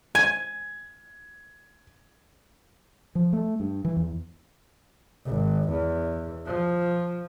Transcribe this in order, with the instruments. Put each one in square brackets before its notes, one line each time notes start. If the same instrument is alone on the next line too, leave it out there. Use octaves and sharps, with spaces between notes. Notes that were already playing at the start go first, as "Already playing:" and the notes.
[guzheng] G#5 [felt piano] G#6
[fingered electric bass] F3
A3
G2
E3
E2
[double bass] G#1
E2
F3